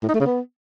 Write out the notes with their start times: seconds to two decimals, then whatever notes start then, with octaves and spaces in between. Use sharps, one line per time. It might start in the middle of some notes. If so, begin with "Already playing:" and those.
0.03 A2
0.09 D#4
0.15 A3
0.20 C#3
0.26 B3